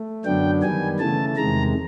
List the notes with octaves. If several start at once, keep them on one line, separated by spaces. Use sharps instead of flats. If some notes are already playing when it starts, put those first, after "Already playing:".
Already playing: A3
F#2 D3 F#3 B3 D4 G5
D#3 G3 B3 G#5
C#3 E3 A3 A5
E2 C3 D#3 G#3 A#5